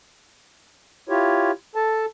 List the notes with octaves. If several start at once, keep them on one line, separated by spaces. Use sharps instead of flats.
E4 F4 G4 C#5
A4 A5